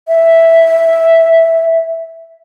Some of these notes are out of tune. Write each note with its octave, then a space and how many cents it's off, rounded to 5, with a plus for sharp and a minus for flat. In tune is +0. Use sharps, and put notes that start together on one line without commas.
E5 -5